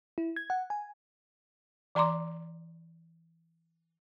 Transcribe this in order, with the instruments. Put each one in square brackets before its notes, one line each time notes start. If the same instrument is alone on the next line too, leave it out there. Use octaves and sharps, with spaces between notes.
[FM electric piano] E4
G#6
F#5
G#5
[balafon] E3 D5 A#5 C6 D6